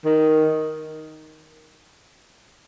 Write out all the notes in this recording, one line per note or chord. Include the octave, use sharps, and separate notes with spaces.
D#3